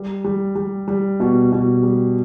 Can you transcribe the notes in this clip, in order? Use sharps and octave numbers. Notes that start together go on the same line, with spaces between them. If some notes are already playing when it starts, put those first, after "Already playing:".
Already playing: G3
G3
G3
G3
B2
B2
G3